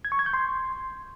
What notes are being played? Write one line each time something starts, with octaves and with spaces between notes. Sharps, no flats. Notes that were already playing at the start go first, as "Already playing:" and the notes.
G#6
C#6
G#6
G6
C6